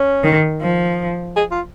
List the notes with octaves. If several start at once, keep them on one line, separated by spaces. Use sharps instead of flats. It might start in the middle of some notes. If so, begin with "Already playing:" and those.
Already playing: C#4
D#3
F3
G#4
F4